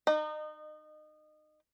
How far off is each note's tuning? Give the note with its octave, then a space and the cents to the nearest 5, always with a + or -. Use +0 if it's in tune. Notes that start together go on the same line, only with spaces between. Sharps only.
D#4 -25 D#5 -35